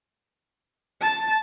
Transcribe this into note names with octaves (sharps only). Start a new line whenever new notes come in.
A5